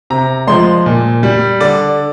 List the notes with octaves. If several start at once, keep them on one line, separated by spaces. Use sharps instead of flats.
C3 A#5
F3 G#3 C6
A#2
G3
D3 D5